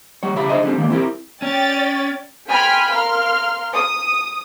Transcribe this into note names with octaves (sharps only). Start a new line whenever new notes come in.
G3 C#5
C#3 G4 E5 B5
D4 G#4 C5 D#5
D3 G3 C4
D#2 G#2 D#3 E3 A#3
C4 E4 G4 A#4
C#4 D5 G5 A6
G5 G#5 B5 C6 F6 B6
A#4 F5 C6 F6
D#6